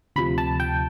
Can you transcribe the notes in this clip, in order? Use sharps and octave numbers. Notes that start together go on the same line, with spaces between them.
D2 C3 F3 B5
A5
G5